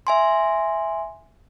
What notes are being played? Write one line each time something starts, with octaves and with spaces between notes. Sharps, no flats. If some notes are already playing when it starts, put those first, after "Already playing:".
E5 G#5 C6